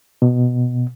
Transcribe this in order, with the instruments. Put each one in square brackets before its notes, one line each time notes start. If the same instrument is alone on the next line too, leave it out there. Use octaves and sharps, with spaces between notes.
[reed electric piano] B2